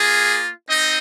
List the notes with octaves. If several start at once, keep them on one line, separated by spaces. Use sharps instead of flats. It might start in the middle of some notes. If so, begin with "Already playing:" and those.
Already playing: A#3 F4 G#4
C4 D#4 D#5